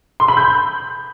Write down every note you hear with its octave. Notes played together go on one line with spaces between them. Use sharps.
C6
B5
G6